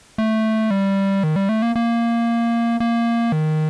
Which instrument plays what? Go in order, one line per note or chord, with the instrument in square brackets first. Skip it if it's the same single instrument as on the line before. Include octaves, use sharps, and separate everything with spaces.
[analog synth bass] A3
G3
D#3
G3
A3
A#3
A#3
A#3
D#3